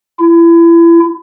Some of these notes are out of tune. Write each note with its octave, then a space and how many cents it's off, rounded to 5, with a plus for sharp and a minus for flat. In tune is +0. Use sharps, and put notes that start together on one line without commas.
E4 +30